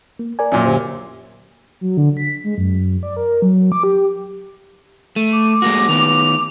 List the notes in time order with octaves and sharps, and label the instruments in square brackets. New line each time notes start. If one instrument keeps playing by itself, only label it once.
[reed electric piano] A#3
A#4 D5 G#5
[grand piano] F#2 A#2
[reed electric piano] D3 G4 C5
[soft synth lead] F#3
D3
B6
G#3
F#2
D5
A#4
F#3
D6
G4
[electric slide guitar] A3 [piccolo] D#7
[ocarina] D6
[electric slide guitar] G#3 A#3 F#4 [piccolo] A#6
[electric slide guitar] D#3 B3 [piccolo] F7